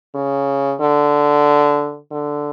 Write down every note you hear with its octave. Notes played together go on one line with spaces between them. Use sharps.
C#3
D3
D3